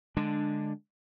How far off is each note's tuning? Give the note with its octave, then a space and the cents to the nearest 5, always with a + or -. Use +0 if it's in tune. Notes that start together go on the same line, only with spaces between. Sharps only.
D3 +0 G#3 +0 D4 +15